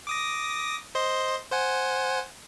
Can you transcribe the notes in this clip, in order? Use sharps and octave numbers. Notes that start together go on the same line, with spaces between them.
D6 D#6 A#6
C5 D#5 C6
C5 F#5 G#5